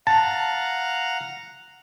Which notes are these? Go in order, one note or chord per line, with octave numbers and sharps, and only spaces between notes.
F5 F#5 A5 A#5